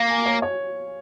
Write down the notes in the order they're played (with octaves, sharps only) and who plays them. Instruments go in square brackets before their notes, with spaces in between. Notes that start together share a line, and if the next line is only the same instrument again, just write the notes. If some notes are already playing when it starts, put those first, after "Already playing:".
Already playing: [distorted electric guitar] A#3 [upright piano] F5
[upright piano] G#5
C#5
C#5